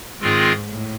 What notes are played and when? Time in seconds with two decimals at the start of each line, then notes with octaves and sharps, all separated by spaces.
0.19 G#2 D#3 G#3 C4 F4 G#4
0.67 A2